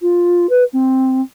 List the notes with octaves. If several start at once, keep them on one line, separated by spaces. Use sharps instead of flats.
F4
B4
C4